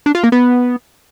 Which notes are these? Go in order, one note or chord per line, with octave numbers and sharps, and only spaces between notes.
D4
F4
A#3
B3